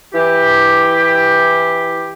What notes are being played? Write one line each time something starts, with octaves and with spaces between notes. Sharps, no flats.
E3 G4